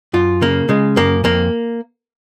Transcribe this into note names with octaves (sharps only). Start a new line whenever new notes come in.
F#2 F4
C#3 A#3
C#3 G#3
F#2 A#3
F2 A#3